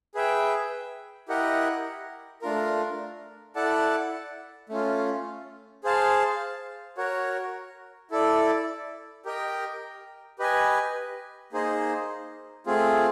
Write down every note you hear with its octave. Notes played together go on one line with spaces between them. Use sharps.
G#4 B4 E5 G5
E4 G4 A#4 D#5 F#5
A3 D4 F4 A#4
E4 A4 D5 F#5 A5
A3 C#4 F4
G#4 C5 F5 A5
F#4 A#4 C#5
E4 A4 D5
G4 A#4 D#5 G5
G4 B4 D#5 G#5
A#3 D#4 G#4 C5 D#5
A3 C4 F4 G#4